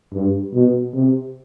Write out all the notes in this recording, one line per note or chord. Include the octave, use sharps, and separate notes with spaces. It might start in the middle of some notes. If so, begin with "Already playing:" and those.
G2
B2
C3